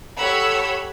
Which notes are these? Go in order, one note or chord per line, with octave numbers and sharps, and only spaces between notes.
G4 A4 C#5 F#5 B5 E6